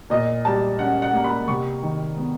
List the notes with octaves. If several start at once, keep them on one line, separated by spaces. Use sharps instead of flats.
A#2 D#5
G3 A5
C#4 F#5
F#5
A#3
B5
C3 C#6
D#3
B3